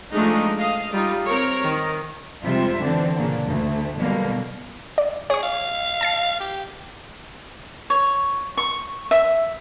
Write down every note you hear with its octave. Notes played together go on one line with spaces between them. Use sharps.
F3 G#3 A3 D4 D#4
D#5 F5
G3 D#4 F4
C4 A#4 C#5
D#3
F2 C3 G3 G#3 F4 E5
D3 E3 C4 D4
A#2 C#3 A#3 D4
D2 A3
B2 D3 D#3 F#3 G3 A#3
D5
G#4 C#5 C#6
F5
A5 A6 C7
G4
C#5
C#6
E5